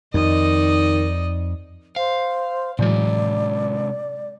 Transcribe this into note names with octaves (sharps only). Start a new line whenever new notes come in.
F2 D#3 D#4 D5 D#5
C5 F5
A2 C3 E3 F#3 G#3 D5